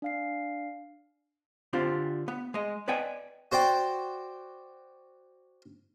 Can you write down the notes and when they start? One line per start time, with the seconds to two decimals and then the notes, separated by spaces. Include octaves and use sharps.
0.02 D4 F5 C7
1.73 D3 C4 D4 F4 G4
2.28 B3
2.54 G#3 D#5
2.88 B4 D5 D#5 G5 G#5
3.52 F#4 C5 D5 G5